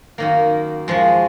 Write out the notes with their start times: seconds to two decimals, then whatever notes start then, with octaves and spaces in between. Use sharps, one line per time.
0.18 F#2 D#3 A#3
0.88 F#2 F3 G#3